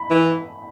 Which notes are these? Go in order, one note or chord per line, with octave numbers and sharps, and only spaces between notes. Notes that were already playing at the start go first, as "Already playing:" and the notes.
Already playing: B5
E3